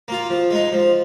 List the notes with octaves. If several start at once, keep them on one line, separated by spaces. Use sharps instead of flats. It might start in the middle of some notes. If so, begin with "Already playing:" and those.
A#3 F4
F3
G#3 D#4
F3